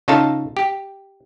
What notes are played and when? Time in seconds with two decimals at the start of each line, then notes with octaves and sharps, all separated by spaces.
0.08 C#3 D#4 F4 A4 F5 A5
0.57 G4